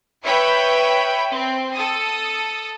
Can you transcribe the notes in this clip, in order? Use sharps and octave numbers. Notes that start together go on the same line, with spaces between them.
B4 C#5 E5 G5 B5
C4
A4 D#6